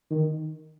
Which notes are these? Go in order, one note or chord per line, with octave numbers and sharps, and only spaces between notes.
D#3